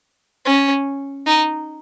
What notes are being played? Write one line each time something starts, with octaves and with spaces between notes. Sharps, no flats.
C#4
D#4